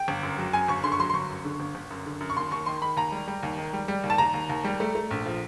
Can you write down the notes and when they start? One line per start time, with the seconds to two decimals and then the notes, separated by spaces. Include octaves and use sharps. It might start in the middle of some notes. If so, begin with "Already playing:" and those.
Already playing: G5
0.08 G1
0.23 F#2
0.39 F#3
0.53 F#2 G#5
0.68 G1 C#6
0.84 D3 C6
0.92 C#6
0.99 F#3 C6
1.10 C6
1.14 G1 C#6
1.30 F#2
1.44 D3
1.60 G1
1.75 G1
1.91 F#2
2.06 D3
2.21 F#2
2.30 C#6
2.36 D#2 C6
2.51 D#2 C#6
2.66 D#3 C6
2.82 D#3 B5
2.97 D#2 A#5
3.12 G3
3.28 G3
3.43 D#2
3.58 D#3
3.73 G3
3.88 G3
4.04 D#2
4.10 A5
4.18 D#2 A#5
4.34 D#2
4.50 D#2
4.64 G3
4.80 A3
4.95 A3
5.11 A#1
5.26 F3